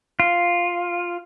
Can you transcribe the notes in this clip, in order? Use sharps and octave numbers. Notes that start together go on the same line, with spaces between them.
F4